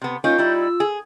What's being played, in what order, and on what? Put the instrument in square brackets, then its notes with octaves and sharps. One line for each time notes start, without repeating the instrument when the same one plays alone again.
[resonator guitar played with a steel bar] C3 B3
[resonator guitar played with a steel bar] A#3 C#4 D#4 [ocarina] F4 [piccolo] G6
[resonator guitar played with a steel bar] G3 D#4 E4
[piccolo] E6
[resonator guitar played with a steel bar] G#4